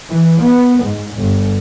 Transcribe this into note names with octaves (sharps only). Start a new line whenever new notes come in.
E3
B3
G#2
G1